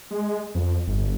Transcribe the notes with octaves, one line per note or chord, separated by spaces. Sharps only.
G#3
F2
G1